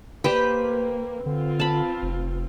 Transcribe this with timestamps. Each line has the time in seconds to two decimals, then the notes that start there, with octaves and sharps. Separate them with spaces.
0.24 A#3 G4 B4 C5 G5
1.26 D3 C4 F4
1.60 A5 B5
2.02 F1